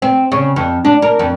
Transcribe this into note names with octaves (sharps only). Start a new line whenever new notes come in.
C4
C#3
F2
D4
A#4
F2